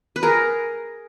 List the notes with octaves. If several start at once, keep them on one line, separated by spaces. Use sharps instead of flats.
B4
G#4 A#4